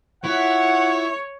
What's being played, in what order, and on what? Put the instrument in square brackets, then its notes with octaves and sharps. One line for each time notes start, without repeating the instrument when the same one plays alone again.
[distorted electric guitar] E4 [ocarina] F4 [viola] C#5 [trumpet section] F#5